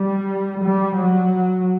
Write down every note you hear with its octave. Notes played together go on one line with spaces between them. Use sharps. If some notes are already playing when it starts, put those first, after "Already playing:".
Already playing: G3
G3
F#3